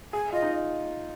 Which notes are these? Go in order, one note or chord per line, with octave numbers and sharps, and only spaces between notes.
G#4 G#5
F4 D#5
D#4